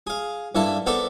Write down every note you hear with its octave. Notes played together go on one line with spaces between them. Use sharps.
G#4 F5
G2 A#3 E4 A4 A5
B3 A4 A#4 C5 D5 E5